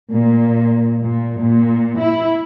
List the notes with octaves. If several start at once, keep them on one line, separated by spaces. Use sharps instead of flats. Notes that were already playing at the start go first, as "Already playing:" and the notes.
A#2
A#2
A#2
E4